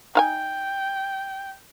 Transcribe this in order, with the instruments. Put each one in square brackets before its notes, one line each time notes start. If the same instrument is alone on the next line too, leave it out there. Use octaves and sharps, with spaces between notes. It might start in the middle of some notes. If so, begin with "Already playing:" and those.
[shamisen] D#4 F5 G#5 [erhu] G5